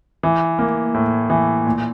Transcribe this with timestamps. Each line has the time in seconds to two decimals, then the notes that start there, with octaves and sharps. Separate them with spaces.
0.23 E3
0.59 A#3
0.94 A2
1.30 E3
1.67 A#2